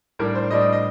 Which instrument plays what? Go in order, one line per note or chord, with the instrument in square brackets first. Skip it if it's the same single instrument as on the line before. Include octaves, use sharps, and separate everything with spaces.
[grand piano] A2 G3 D4 A#4
C5
A2 G3 D4 D#5
D#5
D#5